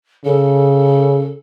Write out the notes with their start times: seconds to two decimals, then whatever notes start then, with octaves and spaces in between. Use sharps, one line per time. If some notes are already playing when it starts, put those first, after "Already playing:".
0.25 C#3 A4